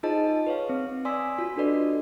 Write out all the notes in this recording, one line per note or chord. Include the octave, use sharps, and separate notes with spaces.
D#4 F4 G#4 C5 D#5 A5
B4 C#5 F5
C4
D5 G#5 C6 D#6 E6 B6
F4 F#4 B6
D4 F#4 A4 B4 D5 D#5